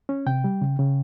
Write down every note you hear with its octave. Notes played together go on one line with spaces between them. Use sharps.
C#4
C3 G5
G3
C#3
C#3